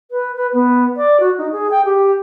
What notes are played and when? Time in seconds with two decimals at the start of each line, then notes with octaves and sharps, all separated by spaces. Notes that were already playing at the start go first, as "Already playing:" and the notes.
0.11 B4
0.35 B4
0.53 B3
0.96 D5
1.20 F#4
1.38 D#4
1.52 G#4
1.71 G5
1.85 G4